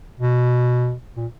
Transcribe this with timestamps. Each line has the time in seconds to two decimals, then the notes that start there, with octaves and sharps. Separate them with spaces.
0.20 B2
1.17 A#2